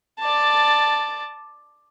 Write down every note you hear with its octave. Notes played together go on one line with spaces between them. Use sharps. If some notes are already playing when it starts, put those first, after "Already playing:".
D5 A5